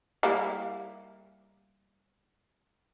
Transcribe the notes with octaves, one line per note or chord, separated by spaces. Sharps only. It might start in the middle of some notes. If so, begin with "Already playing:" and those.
G3 A#3 E4